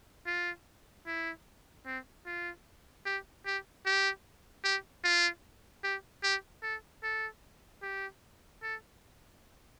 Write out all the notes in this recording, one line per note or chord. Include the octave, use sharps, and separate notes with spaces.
F4
E4
C4
F4
G4
G4
G4
G4
F4
G4
G4
A4
A4
G4
A4